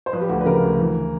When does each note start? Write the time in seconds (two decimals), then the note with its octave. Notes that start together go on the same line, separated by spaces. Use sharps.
0.06 C5
0.13 F3 B4
0.21 G4
0.29 D2 F#4
0.41 B4
0.46 C#3 A#4
0.63 D2
0.79 E3